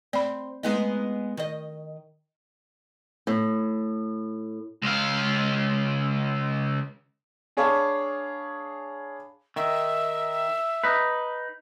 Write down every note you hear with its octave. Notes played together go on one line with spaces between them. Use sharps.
C4 D5 B5
G#3 B3 D#4
D#3 D#5
A2
C#2 F5
D4 G#4 C#5 F5 A5 B5
D#3 E5
D#4 B4